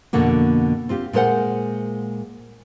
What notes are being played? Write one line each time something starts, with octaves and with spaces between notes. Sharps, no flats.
F2 B2 D3 A#3 F#4
C4 F4 G4
A#2 G#3 A#4 C5 F#5